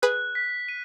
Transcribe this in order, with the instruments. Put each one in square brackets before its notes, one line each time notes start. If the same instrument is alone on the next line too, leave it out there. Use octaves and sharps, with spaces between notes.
[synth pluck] G#4 B4 [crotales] F#6
[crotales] B6
D#7